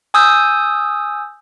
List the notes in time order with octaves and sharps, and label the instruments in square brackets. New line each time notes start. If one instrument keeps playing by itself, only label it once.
[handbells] G#5 D#6 E6 G6